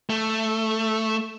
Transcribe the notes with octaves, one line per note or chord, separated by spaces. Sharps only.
A3